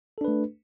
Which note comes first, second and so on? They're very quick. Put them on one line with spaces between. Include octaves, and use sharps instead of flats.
A4 D4 B4 A3